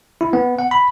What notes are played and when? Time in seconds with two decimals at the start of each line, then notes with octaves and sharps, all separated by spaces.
0.21 E4
0.33 B3
0.59 F#5
0.71 B5